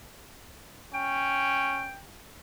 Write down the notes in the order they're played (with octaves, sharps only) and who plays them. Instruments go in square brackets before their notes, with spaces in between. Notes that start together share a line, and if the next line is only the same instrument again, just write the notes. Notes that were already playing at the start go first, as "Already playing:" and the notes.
[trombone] C#4 [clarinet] G5